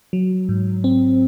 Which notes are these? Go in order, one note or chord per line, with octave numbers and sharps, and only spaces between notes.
F#3
G#2
C4